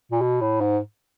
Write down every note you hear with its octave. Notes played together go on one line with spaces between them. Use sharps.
A#2
B2
A2
G#2